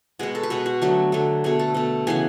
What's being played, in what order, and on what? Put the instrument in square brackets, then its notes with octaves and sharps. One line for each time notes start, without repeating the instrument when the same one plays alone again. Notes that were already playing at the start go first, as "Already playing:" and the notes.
[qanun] B2 G#3 B3 F#4
A4
B4
B2 G#3 B3 A4
F#4
D3 F#3 A3
D3 F#3 A3
B2 A3 G#4
A4
B2 A3
C#3 E3 B3 G#4